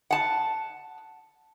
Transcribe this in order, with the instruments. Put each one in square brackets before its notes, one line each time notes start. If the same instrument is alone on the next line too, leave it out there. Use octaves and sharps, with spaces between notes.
[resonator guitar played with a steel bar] F#5 A5